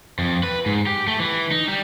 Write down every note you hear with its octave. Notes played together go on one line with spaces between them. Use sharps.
F2
B4
G#2
G4
A3
E3
D#4
G3